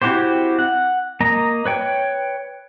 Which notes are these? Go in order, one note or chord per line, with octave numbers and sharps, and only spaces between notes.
C4 E4 F#4 G4 C5
F#5
A#3 D#5 A#5
B4 C#5 G5